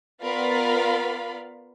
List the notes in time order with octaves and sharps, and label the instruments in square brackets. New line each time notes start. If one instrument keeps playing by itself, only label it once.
[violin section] B3 F4 A#4 D5 F5 B5